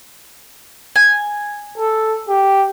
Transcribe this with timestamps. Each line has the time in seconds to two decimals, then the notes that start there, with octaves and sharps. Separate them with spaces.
0.96 G#5
1.78 A4
2.29 G4